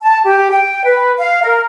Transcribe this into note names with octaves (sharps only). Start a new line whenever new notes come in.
A5
G4
G5
B4
F5
A#4